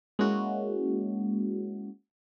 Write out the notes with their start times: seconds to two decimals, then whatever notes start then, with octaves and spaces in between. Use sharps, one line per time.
0.19 G#3 A#3 C#4 E4 F#4